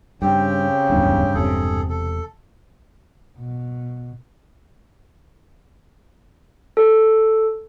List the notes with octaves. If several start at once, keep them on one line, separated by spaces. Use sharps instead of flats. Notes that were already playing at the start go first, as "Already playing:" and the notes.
G2 C#3 C4 G4 G5
D1 E2 G2
E1 C3 G#4 A4
A4
B2
A4